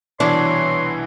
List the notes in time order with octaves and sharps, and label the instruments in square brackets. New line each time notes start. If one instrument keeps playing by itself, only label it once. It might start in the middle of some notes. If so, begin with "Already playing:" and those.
[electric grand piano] C2 B2 E3 [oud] D4 [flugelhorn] C#5 [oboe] C6